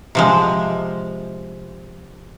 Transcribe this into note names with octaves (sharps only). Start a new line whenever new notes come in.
C3 F3 G#3